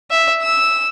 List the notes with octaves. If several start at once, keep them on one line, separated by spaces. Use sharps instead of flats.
E5
E6